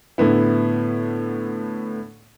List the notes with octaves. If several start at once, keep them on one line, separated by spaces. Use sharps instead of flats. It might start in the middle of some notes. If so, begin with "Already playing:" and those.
A2 D3 B3 E4